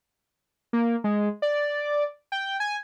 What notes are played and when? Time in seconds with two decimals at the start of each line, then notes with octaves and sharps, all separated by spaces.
0.73 A#3
1.04 G#3
1.42 D5
2.32 G5
2.60 G#5